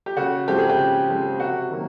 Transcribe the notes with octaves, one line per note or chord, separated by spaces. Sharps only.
G4
C#3 F#4
F3 G#3 C4 G4
G#4
G4
C#3
F3 G#3 C4
C3 F#4
D#3 F#3 A#3